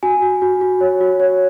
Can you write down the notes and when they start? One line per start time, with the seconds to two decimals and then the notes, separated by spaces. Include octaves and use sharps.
0.03 F#4 G#5
0.22 F#4
0.42 F#4
0.61 F#4
0.81 C#5
1.00 F#4
1.20 C#5